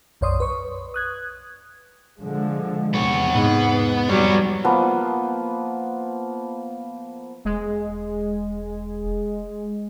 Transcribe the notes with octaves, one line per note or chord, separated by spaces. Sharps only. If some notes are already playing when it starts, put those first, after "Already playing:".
B1 F#2 C#5 D5 C6 D#6
B4 C#6
D#6 F#6 G#6
D3 F3 G#3
E2 C3 B3 C#5
G#2 B3
F2 F#3 G3 B3 C#5
F3 A#3 B3
E1 G#3